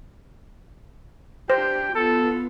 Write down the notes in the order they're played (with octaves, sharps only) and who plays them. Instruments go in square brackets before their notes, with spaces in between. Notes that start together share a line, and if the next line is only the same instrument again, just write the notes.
[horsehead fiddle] D4 G4 [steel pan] C5 [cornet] G5
[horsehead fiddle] B3 F4 [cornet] A4